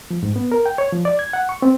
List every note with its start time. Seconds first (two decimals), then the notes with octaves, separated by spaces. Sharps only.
0.11 F3
0.23 G#2
0.36 B3
0.52 A#4
0.66 G5
0.78 C#5
0.93 F3
1.05 D5
1.19 G#6
1.33 F#5
1.49 C#6
1.62 C4